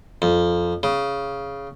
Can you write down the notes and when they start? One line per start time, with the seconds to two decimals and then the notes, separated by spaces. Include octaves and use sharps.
0.22 F2
0.83 C#3